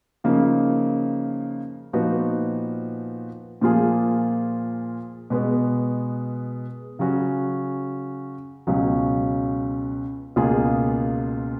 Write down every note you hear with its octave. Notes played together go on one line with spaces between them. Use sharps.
C#3 F3 A#3 D#4
A#2 F3 B3 D#4 F#4
A#2 F3 A#3 F4 G#4
B2 G#3 B3
C#3 F#3 C#4 F#4
C#2 B2 F#3 C#4
C#2 B2 A#3 F4 G#4